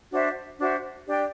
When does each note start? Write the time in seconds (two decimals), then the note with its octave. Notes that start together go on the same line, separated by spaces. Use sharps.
0.11 D4 F#4 C5 E5
0.59 D4 F#4 C5 E5
1.06 D4 G4 D5 G5